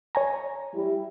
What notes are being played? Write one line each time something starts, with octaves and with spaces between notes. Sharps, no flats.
C#5 G#5 A#5
G3 E4